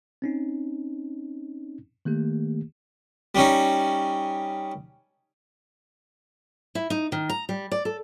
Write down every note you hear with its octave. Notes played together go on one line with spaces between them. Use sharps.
C4 C#4 D#4
D#3 A3 A#3 G4
G3 C#4 D#4
E4
D#4
D#3
A#5
G3
D5
A4